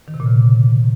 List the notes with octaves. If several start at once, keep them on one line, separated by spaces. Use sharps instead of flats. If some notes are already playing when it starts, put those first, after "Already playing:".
D#3
C3
A#2
C#3